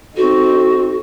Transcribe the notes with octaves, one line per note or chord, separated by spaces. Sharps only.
C4 D#4 F#4 A4